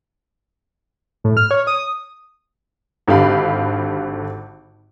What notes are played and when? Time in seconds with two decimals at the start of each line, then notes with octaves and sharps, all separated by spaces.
1.24 A2
1.37 F6
1.51 C#5
1.67 D#6
3.07 G#1 D3 G4 F5 B5